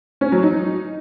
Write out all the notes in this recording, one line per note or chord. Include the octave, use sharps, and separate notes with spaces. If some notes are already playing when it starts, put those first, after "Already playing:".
C#4
F#3
D#4